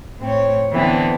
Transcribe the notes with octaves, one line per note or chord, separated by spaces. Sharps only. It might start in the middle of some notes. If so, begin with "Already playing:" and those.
A2 C4 C#5
D3 E3 B3 C4 D4